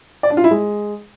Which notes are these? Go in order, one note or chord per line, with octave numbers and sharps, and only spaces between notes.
D5
D4
F4
E4
G#3